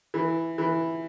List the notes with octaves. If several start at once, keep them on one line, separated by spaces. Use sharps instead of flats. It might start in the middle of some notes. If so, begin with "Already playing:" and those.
E3
E3